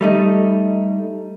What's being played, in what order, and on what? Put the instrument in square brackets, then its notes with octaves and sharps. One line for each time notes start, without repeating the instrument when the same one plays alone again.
[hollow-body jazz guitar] G3 A3 D#4